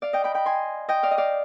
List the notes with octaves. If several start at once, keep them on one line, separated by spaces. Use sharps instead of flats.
D5 F5
D#5 G5
G5 B5
G5 B5
G#5 C6
D#5 G5
D5 F5
D#5
D5 F5